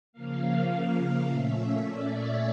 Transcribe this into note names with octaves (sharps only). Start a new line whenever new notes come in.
C#3 F3 A#3 F5
A#2 A3 C#4 E5
D5
C#5